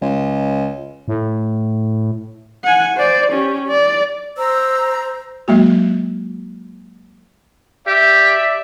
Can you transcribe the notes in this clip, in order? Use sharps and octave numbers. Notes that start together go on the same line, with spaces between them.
C#2
A2
F#5 G#5
C5 D5
C#4 G4
D5
C5 A#5 E6
F#3 G#3 A#3 F#4
G4 D5 E5